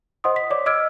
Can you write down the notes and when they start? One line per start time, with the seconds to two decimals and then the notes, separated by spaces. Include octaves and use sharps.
0.24 C5 D#5 F#5 C6 D#6
0.36 B6
0.50 C#5 D5 D6
0.66 D#5 D6 E6 F6 G#6 D7